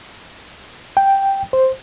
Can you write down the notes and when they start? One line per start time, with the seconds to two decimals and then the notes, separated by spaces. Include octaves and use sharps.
0.97 G5
1.53 C5